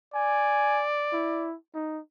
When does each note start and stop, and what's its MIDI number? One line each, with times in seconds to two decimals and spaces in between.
0.14 1.48 74
0.14 0.84 80
1.13 1.56 64
1.74 2.00 63